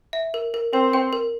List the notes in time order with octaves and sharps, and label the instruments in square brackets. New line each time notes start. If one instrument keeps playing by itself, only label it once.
[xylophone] E5
A#4
A#4
[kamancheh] C4 [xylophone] A#4
[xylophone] G5
A#4